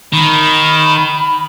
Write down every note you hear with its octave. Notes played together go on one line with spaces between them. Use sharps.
D#3 B5